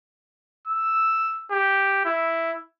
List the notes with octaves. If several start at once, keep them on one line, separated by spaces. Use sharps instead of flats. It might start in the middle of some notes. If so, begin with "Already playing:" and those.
E6
G4
E4